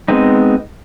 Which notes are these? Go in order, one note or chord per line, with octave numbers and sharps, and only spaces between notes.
G#3 B3 C4 D#4